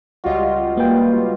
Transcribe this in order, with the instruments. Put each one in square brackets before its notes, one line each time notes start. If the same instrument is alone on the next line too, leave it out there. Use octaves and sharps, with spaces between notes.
[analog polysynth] C#2 G3 F4 [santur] F#4 D#5
[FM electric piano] A#3 G5 [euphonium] B4